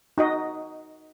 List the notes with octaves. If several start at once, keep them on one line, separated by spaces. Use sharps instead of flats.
D#4 F#4 D#5